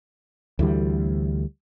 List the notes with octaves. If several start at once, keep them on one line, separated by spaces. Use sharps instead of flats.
D2 E3 G3